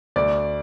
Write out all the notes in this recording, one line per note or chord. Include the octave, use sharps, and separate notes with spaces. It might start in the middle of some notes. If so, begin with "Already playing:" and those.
D2 D5